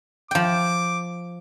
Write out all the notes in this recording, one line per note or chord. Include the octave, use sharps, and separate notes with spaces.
F3 G5 D6